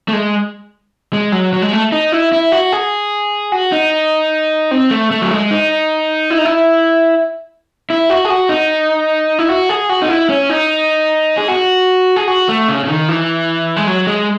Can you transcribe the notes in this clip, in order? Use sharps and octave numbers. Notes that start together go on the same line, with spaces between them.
A3
G#3
G#3
F#3
F#3
G#3
A3
D#4
E4
E4
F#4
G#4
F#4
D#4
C4
A3
A3
F#3
G#3
D#4
E4
D#4
E4
E4
F#4
G#4
F#4
D#4
E4
F#4
G#4
F#4
D#4
E4
C#4
D#4
G#4
F#4
G#4
F#4
A3
C#3
C#3
D#3
E3
G#3
F#3
G#3